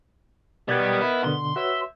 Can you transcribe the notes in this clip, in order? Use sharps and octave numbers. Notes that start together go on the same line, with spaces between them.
B2 D#3 B3 G4 D5 G#6
E4
B2 D3 C6
F#4 B4 C#5 E5